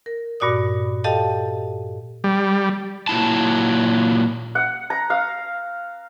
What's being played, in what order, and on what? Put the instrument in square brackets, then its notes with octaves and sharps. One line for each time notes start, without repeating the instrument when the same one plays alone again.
[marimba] A#4
G2 A#2 F#4 D5 D#6
G4 A4 D#5 F5 G5 A5
[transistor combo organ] G3
[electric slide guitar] A#2 F#3 E4 A5
[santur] F#5
A#5
F5